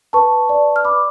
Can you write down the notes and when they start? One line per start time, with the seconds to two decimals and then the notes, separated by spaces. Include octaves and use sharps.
0.13 B4 A5 C#6
0.49 D5
0.76 F6
0.85 D5 B5 D6